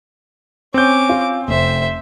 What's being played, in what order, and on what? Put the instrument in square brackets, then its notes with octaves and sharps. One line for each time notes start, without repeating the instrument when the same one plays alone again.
[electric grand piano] C4 G6 [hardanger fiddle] C#4 D6
[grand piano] F4
[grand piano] F1 [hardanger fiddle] C5 E5